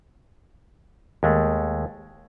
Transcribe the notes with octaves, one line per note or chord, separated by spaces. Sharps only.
D#2 G#3 A3